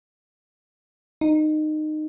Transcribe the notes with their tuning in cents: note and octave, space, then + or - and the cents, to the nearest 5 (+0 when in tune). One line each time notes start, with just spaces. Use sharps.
D#4 -20